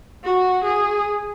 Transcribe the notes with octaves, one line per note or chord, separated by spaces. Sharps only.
F#4
G#4